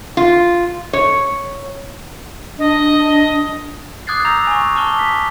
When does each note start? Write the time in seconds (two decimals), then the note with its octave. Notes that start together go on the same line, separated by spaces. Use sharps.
0.17 F4
0.93 C#5
2.59 D4 D#5
4.07 D6 D#6 F#6 G#6 A6 C7
4.25 A#5 E6 G6 A#6 F7
4.47 G#5 C#6
4.75 A5 D6 F6 G7
4.99 B6